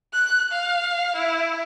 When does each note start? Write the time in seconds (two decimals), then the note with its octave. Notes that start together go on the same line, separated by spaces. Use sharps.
0.13 F#6
0.52 F5
1.16 E4